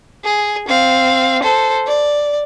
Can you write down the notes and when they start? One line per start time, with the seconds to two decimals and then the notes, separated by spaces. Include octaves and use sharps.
0.24 G#4
0.68 C4 F5
1.43 A4 C5
1.86 D5